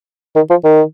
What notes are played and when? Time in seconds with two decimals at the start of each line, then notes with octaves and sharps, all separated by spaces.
0.36 D#3
0.50 F3
0.64 D#3